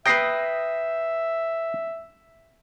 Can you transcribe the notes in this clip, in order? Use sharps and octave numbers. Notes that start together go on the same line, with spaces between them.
B4 E5 G5 D#6 A#6 C7